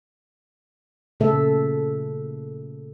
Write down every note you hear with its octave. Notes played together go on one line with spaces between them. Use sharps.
A#2 C#3 A3 A4 E5